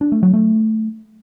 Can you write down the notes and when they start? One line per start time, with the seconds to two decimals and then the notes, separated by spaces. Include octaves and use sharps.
0.01 D4
0.12 A3
0.23 F#3
0.34 A3